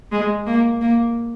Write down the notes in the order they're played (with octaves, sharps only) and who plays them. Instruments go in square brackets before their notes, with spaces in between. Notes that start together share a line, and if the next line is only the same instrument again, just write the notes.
[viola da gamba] G#3
A#3
A#3